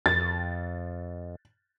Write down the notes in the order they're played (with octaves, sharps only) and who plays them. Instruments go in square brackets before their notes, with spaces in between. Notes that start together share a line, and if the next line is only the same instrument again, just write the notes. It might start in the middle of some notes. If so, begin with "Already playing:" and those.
[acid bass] F2 [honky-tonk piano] A6